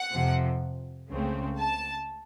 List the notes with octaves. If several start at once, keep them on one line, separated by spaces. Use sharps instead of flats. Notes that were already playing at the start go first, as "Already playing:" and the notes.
Already playing: F#5
F2 C3 F3
C#2 C#3 A3 C4
A5